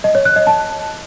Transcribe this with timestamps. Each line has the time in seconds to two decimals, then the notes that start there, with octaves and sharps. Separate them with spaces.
0.04 D#5
0.15 C#5
0.25 F#6
0.36 D#5
0.47 A5